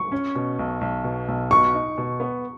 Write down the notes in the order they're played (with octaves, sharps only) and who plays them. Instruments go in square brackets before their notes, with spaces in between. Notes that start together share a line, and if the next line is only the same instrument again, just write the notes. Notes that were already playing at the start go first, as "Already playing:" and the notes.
Already playing: [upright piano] C#6
[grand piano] C#4
B2
B1
B1
B2
B1
[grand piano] B2 [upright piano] C#6
[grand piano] D#4
B2
B3